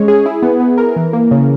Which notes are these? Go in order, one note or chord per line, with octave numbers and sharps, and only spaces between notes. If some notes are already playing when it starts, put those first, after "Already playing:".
Already playing: G#3 C#4 C#5
G#4
E4
B3
B3
A#4
E3
A#3
C#3